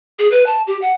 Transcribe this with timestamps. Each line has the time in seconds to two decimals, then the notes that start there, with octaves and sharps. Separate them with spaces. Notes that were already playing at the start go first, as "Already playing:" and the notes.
0.19 G#4
0.31 B4
0.46 A5
0.67 G4
0.82 F#5